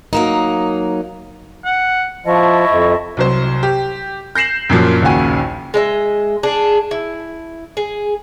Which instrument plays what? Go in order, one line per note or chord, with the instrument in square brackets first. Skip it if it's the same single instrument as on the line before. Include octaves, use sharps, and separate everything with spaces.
[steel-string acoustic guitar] F#3 A#3 D#4
[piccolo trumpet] F#5
[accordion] F3 [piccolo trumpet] E4 [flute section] D#5 A5 C#6
[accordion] F2
[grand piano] C2 F#3 C5
G4
G6 A#6 C7 E7 F#7
F#2 A#2 F3 F#3
A#1 D#2 C#3 F#4 G#5
[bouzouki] G#3 D#5 E5
D4 G#4
E4
G#4